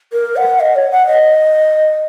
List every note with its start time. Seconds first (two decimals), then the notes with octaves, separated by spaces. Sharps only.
0.13 A#4
0.36 F#5
0.60 D#5
0.76 C#5
0.92 F#5
1.07 D#5